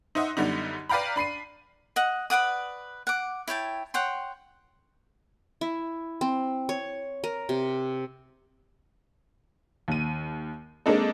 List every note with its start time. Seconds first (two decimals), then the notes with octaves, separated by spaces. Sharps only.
0.15 D#4 C5 D#5 E5 F#5
0.37 F#2 D3 G3 B3 D#4
0.89 B4 D5 F5 G5 A#5 B5
1.16 D4 B5 C7 D#7
1.96 D#5 F#5
2.30 B4 D5 F#5 D#6
3.07 F#5 D6
3.48 E4 C#5 G5 A5
3.94 C#5 F#5 G5 C6
5.61 E4
6.21 C4
6.69 C#5
7.24 A#4
7.49 C3
9.88 D#2 D#7
10.86 G#3 A#3 C4 D4 D#4 A4